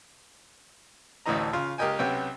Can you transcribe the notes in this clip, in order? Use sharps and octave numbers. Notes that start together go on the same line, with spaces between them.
A1 D2 A2 E3 D#5 A#5
C#3 F4
C#2 G4 A#4 D#5 G5 G#5
B1 C3 B3 C#4 G5